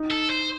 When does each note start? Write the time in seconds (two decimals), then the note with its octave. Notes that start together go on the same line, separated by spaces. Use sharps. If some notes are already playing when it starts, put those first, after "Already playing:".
Already playing: D#4
0.11 A4
0.30 C5